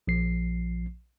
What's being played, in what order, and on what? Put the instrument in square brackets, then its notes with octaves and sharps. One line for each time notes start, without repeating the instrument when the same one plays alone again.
[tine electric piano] A#1 F3 C7